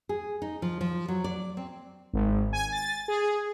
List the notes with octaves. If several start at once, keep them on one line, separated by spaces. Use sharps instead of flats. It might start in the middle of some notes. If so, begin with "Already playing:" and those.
G#4
D#4
F3
F3
F#3
D5
C4
G#1
G#5
A6
G#4